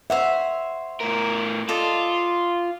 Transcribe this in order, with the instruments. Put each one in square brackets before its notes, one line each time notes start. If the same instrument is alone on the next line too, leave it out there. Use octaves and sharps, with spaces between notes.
[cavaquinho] C5 C#5 F#5 [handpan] E5
[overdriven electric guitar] A2 A#4
[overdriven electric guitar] F4 [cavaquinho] A4 D5 D#5